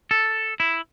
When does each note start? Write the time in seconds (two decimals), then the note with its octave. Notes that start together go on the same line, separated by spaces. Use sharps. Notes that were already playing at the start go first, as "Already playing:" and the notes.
0.11 A4
0.60 E4